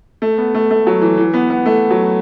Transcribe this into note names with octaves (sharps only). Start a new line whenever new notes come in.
A3
B3
A3
A3
F#3
E3
E3
B3
B3
A3
F#3